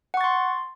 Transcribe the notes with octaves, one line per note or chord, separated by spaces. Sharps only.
F#5 C6 C#6 A6